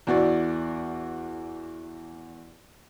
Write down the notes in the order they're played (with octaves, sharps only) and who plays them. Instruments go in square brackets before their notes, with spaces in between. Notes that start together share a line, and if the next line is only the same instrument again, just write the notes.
[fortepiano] E2 F#4 D5